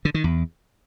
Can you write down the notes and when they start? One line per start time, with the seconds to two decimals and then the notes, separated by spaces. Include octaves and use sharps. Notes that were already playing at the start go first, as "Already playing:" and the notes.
0.05 D3
0.14 D#3
0.24 E2